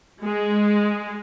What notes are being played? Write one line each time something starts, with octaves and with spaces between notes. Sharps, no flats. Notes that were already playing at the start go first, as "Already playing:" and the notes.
G#3